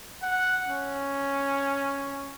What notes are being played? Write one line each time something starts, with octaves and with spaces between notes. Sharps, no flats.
F#5
C#4